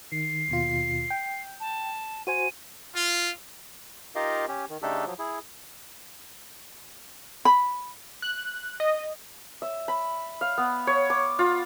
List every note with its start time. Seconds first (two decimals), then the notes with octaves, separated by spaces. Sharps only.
0.12 D#3 C7
0.49 D#2 B2 F4
1.10 G5
1.60 A5
2.27 F#4 C5 G#5 D#7
2.95 F4
4.15 D#4 F4 G4 A#4 D#5 F5
4.48 C#4 G4
4.69 D#3
4.82 C#3 A3 D4 D#4 G4 A4
5.06 F3 F#3
5.19 E4 G#4
7.45 B5
8.22 F#6
8.80 D#5
9.62 E5
9.88 B5
10.41 F5
10.58 B3
10.87 C#5
11.10 D6
11.39 F4